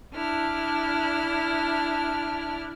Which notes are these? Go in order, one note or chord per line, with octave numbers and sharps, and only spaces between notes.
D4 E4 F6